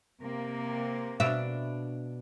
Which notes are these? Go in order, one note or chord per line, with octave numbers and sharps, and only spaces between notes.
C3 A#3
B2 D4 E5